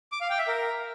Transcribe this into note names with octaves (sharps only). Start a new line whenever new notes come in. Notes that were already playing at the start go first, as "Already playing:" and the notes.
D6
F5
G5
E5
A#4